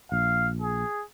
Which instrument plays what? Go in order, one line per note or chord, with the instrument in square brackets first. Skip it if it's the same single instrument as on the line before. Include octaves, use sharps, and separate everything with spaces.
[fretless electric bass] A#1 [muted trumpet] F5
[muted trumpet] G#4